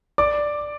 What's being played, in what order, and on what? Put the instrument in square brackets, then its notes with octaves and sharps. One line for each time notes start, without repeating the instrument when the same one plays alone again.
[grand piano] D5 D6